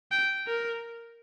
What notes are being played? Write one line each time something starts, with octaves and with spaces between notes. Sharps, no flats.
G5
A#4